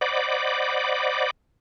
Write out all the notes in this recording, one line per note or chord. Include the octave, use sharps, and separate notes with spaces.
C5 D5 D#5 F#5 B5 D6